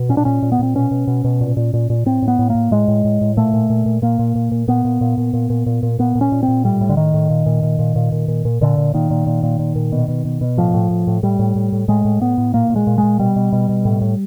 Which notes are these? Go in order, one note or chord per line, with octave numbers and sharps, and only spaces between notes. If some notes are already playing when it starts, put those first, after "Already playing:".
Already playing: B2
A#2 C#4
D4
A#2 C#4
A#2
B3
A#2 C4
B2 C#4
B2
B2
B2
A#2
A#2
A#2
A#2
A2 C4
A2
B3
A2
A#3
A2
A2 G#3
A2
A2
A2
A#2 A3
A#2
A#2
A#2
A#2 A#3
A#2
A#2
A#2
A#2 B3
A#2
A#2
A#2
A#2
A#2
A#2
A#2
A#2 B3
A#2
C#4
A#2
C4
A#2
A2 G3
A2
D3
A2 D#3
A2
A#2
A#2
A#2
A#2
A#2
A#2
A#2
A#2
A#2 D3
A#2
A#2 D#3
A#2
A#2
A#2
A#2
A#2
B2
B2
B2
B2
A2 F3
A2
A2
A2
A2 G3
A2
A2
A2
A2 G#3
A2
A2 B3
A2
A#2 A#3
A#2
G#3
A#2
G#3
A#2
B2 G3
B2
B2
B2
A2
A2